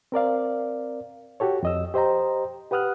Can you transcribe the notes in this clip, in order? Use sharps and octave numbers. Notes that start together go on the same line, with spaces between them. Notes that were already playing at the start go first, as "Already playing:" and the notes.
C4 A#4 D5 F5
F#4 G4 A4 C#5
F2 D#5 E6
G4 C5 D#5 G5 A#5
G4 B4 F#5 D#6 F6 F#6